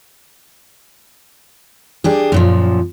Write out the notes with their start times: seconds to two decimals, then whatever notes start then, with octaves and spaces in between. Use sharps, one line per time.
2.04 D4 G4 G#4
2.32 F#2 A#2 F3